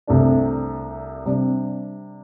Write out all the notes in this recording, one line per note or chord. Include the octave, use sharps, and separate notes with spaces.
C2 C3 A3 D4
C3 G3 D4